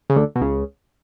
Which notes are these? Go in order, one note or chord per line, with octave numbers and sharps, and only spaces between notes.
C#3
D2 D3
B2
C#2 C#3